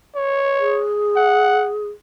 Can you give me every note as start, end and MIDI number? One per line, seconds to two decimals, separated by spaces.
0.16 0.86 73
0.60 1.87 68
1.17 1.71 78